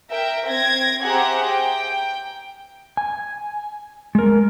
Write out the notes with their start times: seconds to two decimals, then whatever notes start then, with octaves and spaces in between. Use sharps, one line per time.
0.11 A#4 E5 G5
0.48 C4 G#6 A#6
1.04 G4 G#4 C5 E5 F#5 A#5
1.50 G5
2.97 G#5
4.15 G#3 A#4